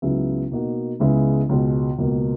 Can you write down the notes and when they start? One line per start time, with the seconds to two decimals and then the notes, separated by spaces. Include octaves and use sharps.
0.02 C#2 C#3 F#3 B3 E4
0.52 B2 A#3 D#4 F#4
1.00 C#2 C#3 G#3 B3 E4
1.49 C#2 B2 G#3
1.98 C#2 B2 A#3